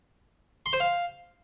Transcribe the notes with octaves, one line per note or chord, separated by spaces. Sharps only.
C6
C5
F5